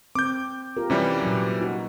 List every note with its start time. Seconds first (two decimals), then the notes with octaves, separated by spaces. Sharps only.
0.15 C4 D6 G6
0.77 F4 G4 A#4
0.90 C3 E3 G3 C#4
1.22 A#2 F#3
1.61 D#4 F#4